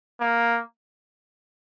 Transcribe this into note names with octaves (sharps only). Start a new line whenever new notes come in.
A#3